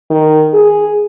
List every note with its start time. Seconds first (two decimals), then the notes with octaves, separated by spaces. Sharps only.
0.10 D#3
0.54 G#4